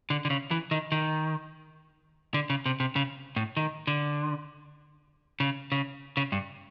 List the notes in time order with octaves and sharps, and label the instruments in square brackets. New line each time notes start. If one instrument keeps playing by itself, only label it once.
[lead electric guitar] D3
D3
C#3
E3
D#3
D#3
D3
C#3
C3
C3
C#3
A2
D#3
D3
C#3
C#3
C#3
G2